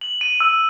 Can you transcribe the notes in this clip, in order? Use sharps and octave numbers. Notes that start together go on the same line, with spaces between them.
F#7
D#7
E6